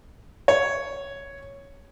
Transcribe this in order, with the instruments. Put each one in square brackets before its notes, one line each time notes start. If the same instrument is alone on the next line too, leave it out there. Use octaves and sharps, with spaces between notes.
[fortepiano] C#5